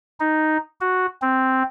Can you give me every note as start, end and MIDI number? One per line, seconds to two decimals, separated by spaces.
0.20 0.57 63
0.81 1.06 66
1.22 1.63 60